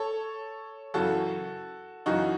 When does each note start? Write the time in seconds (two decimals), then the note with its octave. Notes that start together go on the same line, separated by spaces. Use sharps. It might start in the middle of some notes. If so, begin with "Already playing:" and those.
Already playing: A4 C#5
0.94 F#2 C#3 E3 F#4 A4
2.06 F#2 C#3 E3 D#4 F#4